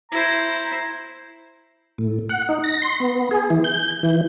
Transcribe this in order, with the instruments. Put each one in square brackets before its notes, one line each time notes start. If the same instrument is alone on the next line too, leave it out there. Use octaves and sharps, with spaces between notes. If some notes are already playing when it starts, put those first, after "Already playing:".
[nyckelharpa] E4 C5 [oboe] A#5
[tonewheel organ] A2
F#5
D#4
A#6
C6
B3
G#4
E3
G6
E3